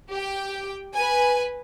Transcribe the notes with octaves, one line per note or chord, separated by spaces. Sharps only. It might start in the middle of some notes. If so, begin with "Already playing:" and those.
G4 G5
B4 G#5